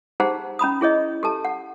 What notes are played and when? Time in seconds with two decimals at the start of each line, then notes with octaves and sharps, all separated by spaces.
0.20 D#4 G4 G#4 C5 F#5 A#5
0.59 C#4 A#5 B5 D#6
0.81 E4 G#4 C#5 D#5
1.23 G4 A4 A5
1.45 F#5